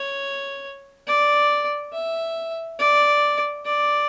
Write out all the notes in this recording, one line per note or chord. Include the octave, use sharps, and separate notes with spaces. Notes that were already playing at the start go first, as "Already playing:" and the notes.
Already playing: C#5
D5
E5
D5
D5